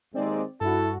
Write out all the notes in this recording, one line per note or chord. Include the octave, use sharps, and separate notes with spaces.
D#2 G#3 C4 D#4 D5
G2 E4 F#4 A4